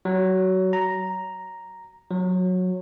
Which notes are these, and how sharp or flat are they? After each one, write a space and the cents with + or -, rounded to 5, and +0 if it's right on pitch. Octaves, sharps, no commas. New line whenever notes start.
F#3 +20
A#5 +0
F#3 -15